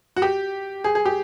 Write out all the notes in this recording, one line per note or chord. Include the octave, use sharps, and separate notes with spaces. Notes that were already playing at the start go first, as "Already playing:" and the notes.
F#4
G4
G#4
G#4
G4